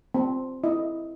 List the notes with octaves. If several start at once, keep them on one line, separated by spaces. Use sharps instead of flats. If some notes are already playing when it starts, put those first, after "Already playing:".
C4
E4 D#5